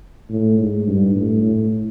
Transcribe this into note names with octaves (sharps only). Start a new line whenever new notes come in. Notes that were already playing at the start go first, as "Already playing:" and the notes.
A2
G#2
G2
A2
A2